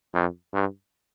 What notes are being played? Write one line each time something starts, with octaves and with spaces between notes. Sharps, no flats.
F2
G2